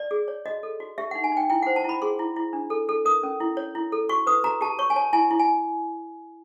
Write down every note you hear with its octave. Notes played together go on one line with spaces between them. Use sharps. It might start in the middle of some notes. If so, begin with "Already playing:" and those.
Already playing: D5
G#4
C#5
F#4 D#5
A4
F#4
G4 E5
D#4 F#5
G#5
D#4 G5
E4 G5
C5 F#5
A5
E4 B5
G#4 C6
E4
E4
D4
A4
A4
A#4 D#6
C#4
E4
C#5
E4
A4
F#4 C#6
B4 D#6
F#4 A#5
G4 A5
C#5 C#6
G#5
C#5 A5
E4 G#5
E4
G#5